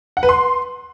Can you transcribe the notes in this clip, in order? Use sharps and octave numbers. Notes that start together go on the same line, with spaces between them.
F#5
B4
C6